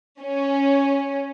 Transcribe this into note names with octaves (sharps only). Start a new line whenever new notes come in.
C#4